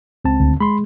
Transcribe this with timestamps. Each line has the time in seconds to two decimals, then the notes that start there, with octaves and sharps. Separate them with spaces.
0.25 C#2 C4 A5
0.40 D2
0.60 G#3 B5 C6